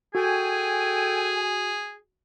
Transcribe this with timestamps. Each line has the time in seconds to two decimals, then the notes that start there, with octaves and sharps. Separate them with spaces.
0.15 F#4 G#4 A4 G5 G#5